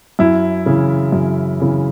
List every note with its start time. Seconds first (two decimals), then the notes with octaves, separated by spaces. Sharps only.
0.19 F#2 E4
0.66 C#3 E3
1.12 F#2
1.60 C#3 E3